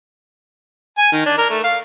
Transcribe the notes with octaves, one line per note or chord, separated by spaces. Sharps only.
G#5
D#3
D4
A#4
A3
F5